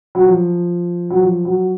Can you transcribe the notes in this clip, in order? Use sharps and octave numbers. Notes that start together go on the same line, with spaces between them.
F#3
F3
F#3
F3
F#3